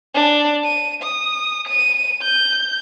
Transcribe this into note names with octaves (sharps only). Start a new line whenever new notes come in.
D4
D#7
D#6
D#7
G6